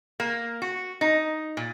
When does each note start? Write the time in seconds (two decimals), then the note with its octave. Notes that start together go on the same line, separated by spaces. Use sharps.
0.20 A#3
0.62 F#4
1.01 D#4
1.57 A#2